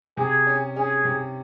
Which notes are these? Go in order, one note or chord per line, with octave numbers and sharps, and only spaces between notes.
C3 G#4
C#4
C#4 G#4
C3